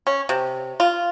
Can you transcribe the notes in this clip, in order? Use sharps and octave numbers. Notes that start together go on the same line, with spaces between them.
C#4
C3
F4